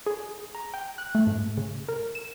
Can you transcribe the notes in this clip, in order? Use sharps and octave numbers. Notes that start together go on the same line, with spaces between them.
G#4
A#5
G5
F#6
A3
G#2
C#3
A#4
E7